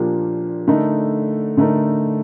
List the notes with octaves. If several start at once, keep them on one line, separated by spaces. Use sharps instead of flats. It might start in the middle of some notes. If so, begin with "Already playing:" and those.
Already playing: A#2 F3 A#3 D4 G4
D3 A3 D#4 A#4
D3 A3 D#4 A#4